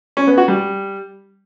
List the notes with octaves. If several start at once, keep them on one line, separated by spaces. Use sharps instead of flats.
C#4
B3
F#4
G3